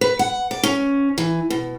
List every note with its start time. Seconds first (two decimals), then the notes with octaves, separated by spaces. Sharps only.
0.01 B4
0.19 F#5
0.51 D5
0.63 C#4
1.18 E3
1.50 B2